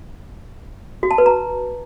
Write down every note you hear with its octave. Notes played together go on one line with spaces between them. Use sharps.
F#4
A5
B4
A#5